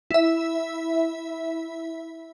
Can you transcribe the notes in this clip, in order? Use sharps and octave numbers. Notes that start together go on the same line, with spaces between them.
E4 E5